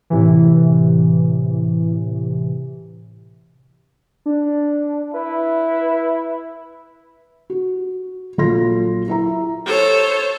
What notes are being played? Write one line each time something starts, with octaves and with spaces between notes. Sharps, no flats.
A2 C3 E3
D4
E4 B4
F#4
A#1 F#3 F4 A4 C6 A#6
E4 E5 A#5
A4 C5 C#5